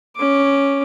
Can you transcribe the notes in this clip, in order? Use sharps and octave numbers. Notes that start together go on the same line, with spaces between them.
C#4 D6